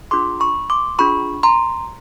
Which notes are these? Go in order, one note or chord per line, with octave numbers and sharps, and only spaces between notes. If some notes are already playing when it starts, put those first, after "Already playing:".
D4 F4 G#4 C6 D6
B5 C#6
C6 D6
D4 F4 G#4 B5 C#6
A#5 C6